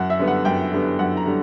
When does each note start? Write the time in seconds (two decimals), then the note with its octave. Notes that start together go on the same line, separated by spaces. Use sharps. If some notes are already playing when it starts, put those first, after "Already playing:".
Already playing: F#2 F#5
0.10 E5
0.19 D3 G3 B3
0.28 F#5
0.45 F#2 G5
0.72 D3 G3 B3
0.99 F#2 F#5
1.17 A#5
1.26 D3 G3